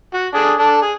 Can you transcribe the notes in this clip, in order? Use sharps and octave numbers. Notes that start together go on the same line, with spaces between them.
F#4
D4 G#4 A4
D4 A4
G#4